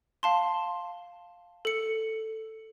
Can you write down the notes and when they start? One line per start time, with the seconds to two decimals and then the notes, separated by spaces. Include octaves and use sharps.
0.23 F5 A5 C6
1.65 A4 C#7